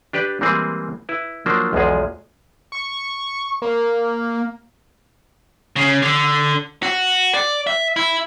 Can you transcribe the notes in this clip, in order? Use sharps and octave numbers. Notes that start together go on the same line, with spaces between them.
D4 G4 B4 D5
E3 G3 G#3 A#3 C4 G#4
E4 B4
F3 F#3 A#3 D4 C5
B1 E2 F3 G#3 G#4
C#6
A#3
C#3
D3
F#4
D5
E5
E4